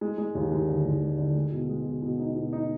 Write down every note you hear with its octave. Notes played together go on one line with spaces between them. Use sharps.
G#3
G#3
D#2
D#2
D3
D#2
G#3
D3
G#3
B2
G#3
B2
B2
D#4
B2
D#4